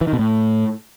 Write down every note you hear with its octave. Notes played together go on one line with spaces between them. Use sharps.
E3
D#3
B2
A2